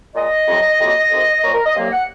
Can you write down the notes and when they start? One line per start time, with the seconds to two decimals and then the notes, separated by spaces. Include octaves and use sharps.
0.15 A#2 G#3 D#5
0.47 F2 C3 F#3
0.79 F2 C3 F#3 A#3
1.11 F2 C3 D#3
1.43 A#2 F3 A#3 C#5
1.54 A#4
1.65 D#5
1.75 C2 C3 F#3 A#3 F5
1.92 F#5